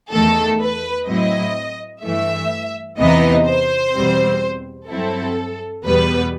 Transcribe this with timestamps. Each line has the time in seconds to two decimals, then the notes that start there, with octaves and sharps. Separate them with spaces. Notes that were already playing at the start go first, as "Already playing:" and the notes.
0.12 E2 D#3 A3 A4
0.60 B4
1.07 A2 F#3 C4 E4 D#5
2.03 G2 E3 A3 E5
2.98 E2 C3 E3 B3 D#4 D#5
3.46 C5
3.93 E2 B2 G3 C4
4.89 G2 F#3 C4 E4 A4
5.85 E2 B2 G3 B3 B4